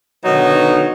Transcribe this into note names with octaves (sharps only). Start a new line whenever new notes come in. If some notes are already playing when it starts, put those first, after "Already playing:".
B2 D3 D#3 F#3 B3 D#4